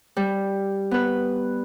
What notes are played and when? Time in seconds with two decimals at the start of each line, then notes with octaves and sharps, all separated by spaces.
0.16 G3
0.91 B3 B4